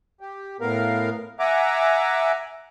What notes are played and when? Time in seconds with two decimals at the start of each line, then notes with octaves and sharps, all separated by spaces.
0.20 G4
0.60 A2 B3 A#4 F5
1.39 E5 F#5 G#5 A#5 D6